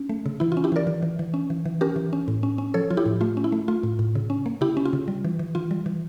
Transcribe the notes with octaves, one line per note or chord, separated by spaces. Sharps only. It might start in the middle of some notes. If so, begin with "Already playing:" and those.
Already playing: C#4
A3
C#3
E3 E4
F4
C#4
E4 G4
E3 A#4 D5
E3
E3
E3
C#4
E3
E3
C#4 G4 A#4
E3
C#4
A2
C#4
C#4
F3 A4 C#5
F3 F4
E4 G4
A2
A3 F4
C#4
E4
A3
A3 F4
A2
A2
C#3
C#4
A#3
C#3 E4 G4
C#4
F4
C#3
G3
E3
E3
E3 F4
G3
E3